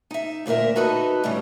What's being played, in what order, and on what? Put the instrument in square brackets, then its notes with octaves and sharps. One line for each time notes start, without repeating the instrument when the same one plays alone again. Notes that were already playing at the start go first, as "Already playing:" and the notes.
[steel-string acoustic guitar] D#4 E5
D2 A#2 C#4 A#4 E5
D#4 F#4 A4 B4 D#5
A2 D3 G3 C#4